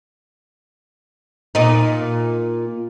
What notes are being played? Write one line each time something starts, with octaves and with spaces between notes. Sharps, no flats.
A#2 D#4